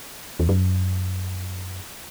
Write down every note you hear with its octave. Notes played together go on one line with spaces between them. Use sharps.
E2
F#2